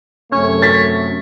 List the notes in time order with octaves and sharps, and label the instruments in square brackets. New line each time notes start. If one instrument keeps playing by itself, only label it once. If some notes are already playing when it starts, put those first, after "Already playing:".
[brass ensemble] F#2 C3 A3 [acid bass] C#4 [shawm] C#5
[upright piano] A6 B6